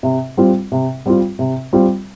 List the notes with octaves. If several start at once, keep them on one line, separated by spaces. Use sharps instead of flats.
C3
G3 C4 F4
C3
G3 C4 F4
C3
G3 C4 F4